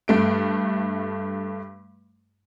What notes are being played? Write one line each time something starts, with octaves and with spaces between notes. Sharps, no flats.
G2 A3 D7